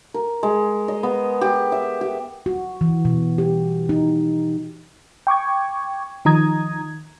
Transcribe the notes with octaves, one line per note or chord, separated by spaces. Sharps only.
A#4
G#3
D#5
B3
G4
E5
G4
F#4
E3
B2
G4
D#4
G5 C#6 D6 G#6
D#3 F3 D#4 A#5 D#6 G#6